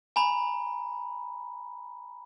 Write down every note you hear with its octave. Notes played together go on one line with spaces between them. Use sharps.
G#5 A#5 B5